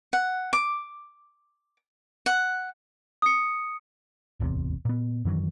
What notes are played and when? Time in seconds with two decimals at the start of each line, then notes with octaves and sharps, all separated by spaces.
0.13 F#5
0.53 D6
2.26 F#5
3.22 D#6 C#7
4.40 D1 G#1 E2 C3
4.85 A#2 B3
5.25 F#2 D#3 E3 F#3